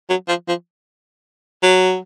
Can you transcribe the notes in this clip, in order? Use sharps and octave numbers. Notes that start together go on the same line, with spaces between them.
F#3
F3
F3
F#3